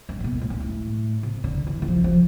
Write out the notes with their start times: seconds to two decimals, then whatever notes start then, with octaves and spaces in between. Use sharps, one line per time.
0.09 G2
0.20 A2
0.24 B2
0.41 A2
0.50 G2
0.60 A2
1.23 C3
1.44 D3
1.67 E3
1.82 E3
1.88 F3
2.04 F3